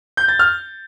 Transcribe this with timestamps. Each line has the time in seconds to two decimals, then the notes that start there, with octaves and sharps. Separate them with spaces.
0.17 G6
0.28 A6
0.39 F6